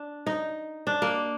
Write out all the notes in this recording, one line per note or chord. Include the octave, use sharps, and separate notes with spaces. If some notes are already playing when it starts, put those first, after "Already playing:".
Already playing: D4
D#4
D4
A#3